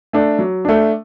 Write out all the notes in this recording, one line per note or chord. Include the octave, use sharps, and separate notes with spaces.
A3 D4
F#3
A3 D4